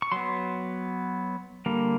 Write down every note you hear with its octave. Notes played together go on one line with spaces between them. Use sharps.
C#6
F#3 B3 C6
D3 G3 A#3